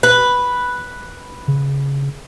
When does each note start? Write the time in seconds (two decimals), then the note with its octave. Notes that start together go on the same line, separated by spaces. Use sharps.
0.03 B4
1.48 C#3